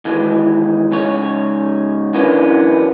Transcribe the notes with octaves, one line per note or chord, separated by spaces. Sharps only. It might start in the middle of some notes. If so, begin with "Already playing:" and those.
D#2 E3 G#3
G#2 C#3 C#5
F#2 E3 A#3 B3 C#4 D4